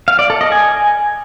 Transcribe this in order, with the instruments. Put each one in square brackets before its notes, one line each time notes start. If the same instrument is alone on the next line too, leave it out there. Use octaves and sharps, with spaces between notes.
[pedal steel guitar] F5
D5
A4
D#5
G#5